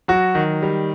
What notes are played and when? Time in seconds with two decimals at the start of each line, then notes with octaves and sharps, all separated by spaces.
0.08 F#3 F#4
0.35 D#3
0.62 G3